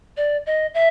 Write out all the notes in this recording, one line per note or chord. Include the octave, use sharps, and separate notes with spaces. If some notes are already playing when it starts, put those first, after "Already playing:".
D5
D#5
E5